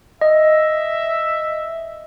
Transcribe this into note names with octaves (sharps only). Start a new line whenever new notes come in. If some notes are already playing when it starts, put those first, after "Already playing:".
D#5 E5